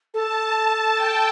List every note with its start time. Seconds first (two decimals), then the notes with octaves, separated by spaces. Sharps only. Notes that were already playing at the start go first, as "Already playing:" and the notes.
0.13 A4 A5
0.94 G5